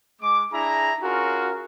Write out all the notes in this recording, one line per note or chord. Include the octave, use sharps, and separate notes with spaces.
G#3 D6
D4 E4 G#4 A#5
C#4 F4 F#4 G#4 A#4